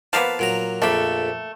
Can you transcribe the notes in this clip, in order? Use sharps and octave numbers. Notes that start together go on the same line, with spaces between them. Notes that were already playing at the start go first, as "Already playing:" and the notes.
F3 A#3 B3 B4 F5 A5
A#2 F#3 A#5
A#1 F2 A3 A#3 B5